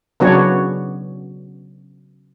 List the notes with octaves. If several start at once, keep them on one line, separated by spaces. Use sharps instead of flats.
C#3 F#3 B3 D4 F#4 C#5